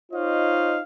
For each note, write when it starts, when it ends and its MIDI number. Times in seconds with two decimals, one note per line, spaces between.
0.13 0.80 63
0.13 0.80 65
0.13 0.80 72
0.13 0.80 73
0.13 0.80 75
0.13 0.80 77